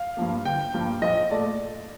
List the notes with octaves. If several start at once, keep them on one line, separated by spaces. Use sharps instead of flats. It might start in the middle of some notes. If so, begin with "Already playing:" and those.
Already playing: F5
G2 F3 A#3
G1 G5
G2 F3 A#3
A#1 D#5
A#2 A3 D5